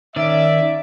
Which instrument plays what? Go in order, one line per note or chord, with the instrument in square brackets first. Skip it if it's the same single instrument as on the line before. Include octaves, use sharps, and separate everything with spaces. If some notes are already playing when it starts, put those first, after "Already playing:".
[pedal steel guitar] D#3 C#4 [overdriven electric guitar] D5 [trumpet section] E5